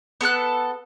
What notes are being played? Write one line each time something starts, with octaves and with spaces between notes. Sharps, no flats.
B3 A4 E6 F#6